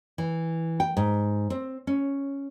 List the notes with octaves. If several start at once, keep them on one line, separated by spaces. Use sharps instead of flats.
E3
G5
G#2
C4
C#4